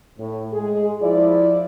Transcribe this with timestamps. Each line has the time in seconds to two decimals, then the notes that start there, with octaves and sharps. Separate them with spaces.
0.19 A2
0.54 G#3 G#4
1.02 F3 E4 D5